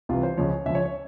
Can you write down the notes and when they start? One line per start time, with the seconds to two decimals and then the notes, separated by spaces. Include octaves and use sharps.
0.09 C2 C3 E3 F4
0.23 C5
0.37 C#2 C#3 F3 C#5
0.66 C#2 C#3 F3 E5
0.75 C#5
0.86 C#5